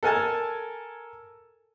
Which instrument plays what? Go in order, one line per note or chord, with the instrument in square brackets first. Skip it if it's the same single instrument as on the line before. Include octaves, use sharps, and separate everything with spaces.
[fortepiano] A4 A#4 G#5 A5